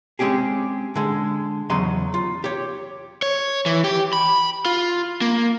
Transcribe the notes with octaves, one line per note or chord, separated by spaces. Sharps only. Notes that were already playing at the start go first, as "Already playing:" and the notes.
G#3 C4 C#4 G4 G#4
D3 G#3
E2 C#3 F#3 D#5 C6
F4
G4 C#5
C#5
E3
G4
B5
F4
A#3